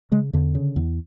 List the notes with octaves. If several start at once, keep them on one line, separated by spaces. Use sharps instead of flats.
C#3 G#3
E2 D3
C#3
E2